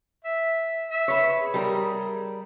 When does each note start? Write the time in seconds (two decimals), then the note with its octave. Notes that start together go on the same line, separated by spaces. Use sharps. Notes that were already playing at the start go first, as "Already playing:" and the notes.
0.25 E5
0.91 E5
1.08 B4 C#5
1.37 G#4
1.54 G3 A#4